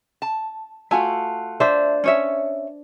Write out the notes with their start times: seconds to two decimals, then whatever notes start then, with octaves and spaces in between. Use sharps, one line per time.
0.22 A5
0.91 A3 F4 F#4 G#5
1.60 D4 C5 E5
2.04 C#4 C#5 E5